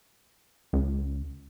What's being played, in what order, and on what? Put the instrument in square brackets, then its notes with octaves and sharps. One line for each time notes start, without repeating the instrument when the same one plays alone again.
[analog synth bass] C#2